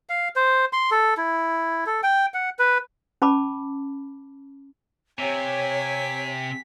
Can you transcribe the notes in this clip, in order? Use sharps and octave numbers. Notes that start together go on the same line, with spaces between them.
F5
C5
C6
A4
E4
A4
G5
F#5
B4
C#4 A5 B5 D6
C3 G4 C#5 G#5 B6